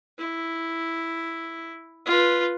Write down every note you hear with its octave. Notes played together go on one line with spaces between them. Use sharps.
E4
F4 B4